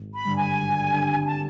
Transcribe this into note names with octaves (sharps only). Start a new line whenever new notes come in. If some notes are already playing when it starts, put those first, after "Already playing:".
Already playing: G#1
B5
G2 D3 G3
G#5
G#1
G2 D3 G3
A5